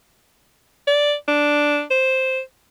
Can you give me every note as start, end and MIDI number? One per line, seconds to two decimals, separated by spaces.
0.87 1.14 74
1.28 1.83 62
1.91 2.40 72